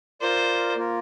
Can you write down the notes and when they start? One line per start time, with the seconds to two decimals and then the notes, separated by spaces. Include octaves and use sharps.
0.21 F4 A#4 C5 D5
0.76 A#3 F4 A#4